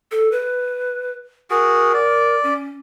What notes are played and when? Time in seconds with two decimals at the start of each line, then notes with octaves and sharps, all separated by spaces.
0.11 A4
0.32 B4
1.50 F#4 G#4 A#4
1.94 D5
2.43 C#4